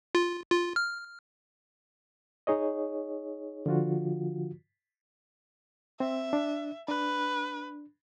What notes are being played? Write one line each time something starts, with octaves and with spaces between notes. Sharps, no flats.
F4
F4
F6
D#4 G#4 C#5 D#5
D3 F3 F4 F#4
C4 E5
D4
D4 B4